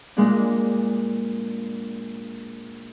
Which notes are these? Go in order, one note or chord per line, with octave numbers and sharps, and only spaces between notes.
A#2 G#3 D4